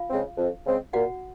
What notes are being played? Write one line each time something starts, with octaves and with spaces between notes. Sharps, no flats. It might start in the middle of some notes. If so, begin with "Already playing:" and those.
Already playing: F4 F5
C#3 G#3 C4
F2
C#3 G#3 C4
A#2 F#4 F#5